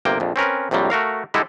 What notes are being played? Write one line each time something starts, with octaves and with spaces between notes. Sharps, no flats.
G1 C3 A#3 G5
A#1 F2
C4 C#4 A#4 B4
A#1 F2 C3 F#3 G3
A3 F#4 A#4 F5
D3 G3 G#3 D#4 E4 A4